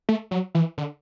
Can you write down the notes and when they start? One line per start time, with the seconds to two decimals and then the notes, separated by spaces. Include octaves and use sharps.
0.09 A3
0.31 F#3
0.55 E3
0.78 D3